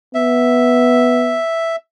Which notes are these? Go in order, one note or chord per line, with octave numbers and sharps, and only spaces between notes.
B3 E5